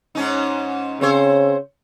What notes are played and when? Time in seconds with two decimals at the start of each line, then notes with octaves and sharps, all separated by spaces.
0.15 G#2 C#4 D#4
1.01 C#3 C4 C5 C#5